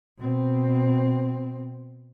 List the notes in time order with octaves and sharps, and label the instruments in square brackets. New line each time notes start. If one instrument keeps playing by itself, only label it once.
[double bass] B2 C4